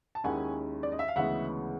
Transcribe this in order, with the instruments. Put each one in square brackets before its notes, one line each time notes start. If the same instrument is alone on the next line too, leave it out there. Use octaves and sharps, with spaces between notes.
[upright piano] A5
[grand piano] D#2 D#3 G#3 C#4 E4 [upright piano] F#5 G#5
[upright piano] D5
D#5
E5
F5
[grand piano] D2 C#3 E3 G#3 B3 [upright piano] E5 F#5